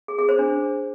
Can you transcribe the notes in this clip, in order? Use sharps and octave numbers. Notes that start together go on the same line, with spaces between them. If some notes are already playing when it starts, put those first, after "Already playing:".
G#4
G#4
C5
D4